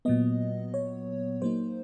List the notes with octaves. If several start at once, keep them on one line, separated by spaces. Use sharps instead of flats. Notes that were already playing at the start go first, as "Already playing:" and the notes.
A#2 F#3 B3 D#5
C#5
F#3 A#3 D#4 C5